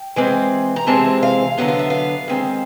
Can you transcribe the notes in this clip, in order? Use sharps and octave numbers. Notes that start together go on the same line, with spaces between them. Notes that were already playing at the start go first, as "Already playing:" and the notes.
Already playing: G5
E3 G#3 C4
A#5
C3 E3 G#3 C4 A5
F5
D3 F#3 B3 F#5
F5
E5
F5
D#3 G#3 C4